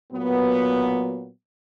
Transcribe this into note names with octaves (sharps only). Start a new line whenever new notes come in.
A#2 F#3 B3